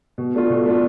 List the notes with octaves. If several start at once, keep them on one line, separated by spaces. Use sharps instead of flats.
B2
A3 D4 F4
B2
A3 D4 F4